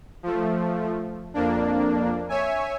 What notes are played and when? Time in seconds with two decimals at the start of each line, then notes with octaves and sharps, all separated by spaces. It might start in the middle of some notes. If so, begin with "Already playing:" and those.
0.23 F3 A3
1.34 F2 A#3 D4
2.29 C#5 E5 G#5